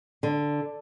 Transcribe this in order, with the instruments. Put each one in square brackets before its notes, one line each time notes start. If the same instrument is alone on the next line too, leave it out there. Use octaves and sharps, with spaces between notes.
[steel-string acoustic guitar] D3